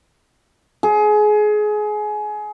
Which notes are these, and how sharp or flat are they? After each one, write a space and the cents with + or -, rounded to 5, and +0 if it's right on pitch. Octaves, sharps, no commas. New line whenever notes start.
G#4 +25